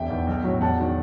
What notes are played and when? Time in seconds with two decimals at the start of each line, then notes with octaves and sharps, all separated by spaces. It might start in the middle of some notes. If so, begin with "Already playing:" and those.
Already playing: E1 E5 G5
0.10 E2 D#3
0.27 B1
0.44 A2 F#3
0.61 E1 F#5 A5
0.79 D#3 F#3